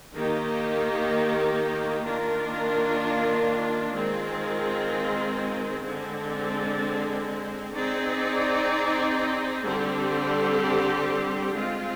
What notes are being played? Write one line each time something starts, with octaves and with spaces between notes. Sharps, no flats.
D#3 A#3 D#4 G4
D#3 A#3 D4 F4 A#4
D#3 G#3 C4 F4
D3 G#3 C4
C4 D#4 G#4 D5
D3 G3 C4 G4
G#3 C4 F4